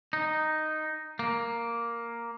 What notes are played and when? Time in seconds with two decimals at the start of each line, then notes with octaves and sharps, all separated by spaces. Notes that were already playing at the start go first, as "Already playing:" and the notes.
0.13 D#4
1.19 A#3